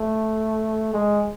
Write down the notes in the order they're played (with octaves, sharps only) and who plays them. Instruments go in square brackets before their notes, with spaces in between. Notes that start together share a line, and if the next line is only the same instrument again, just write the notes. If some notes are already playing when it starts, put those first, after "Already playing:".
Already playing: [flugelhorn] A3
G#3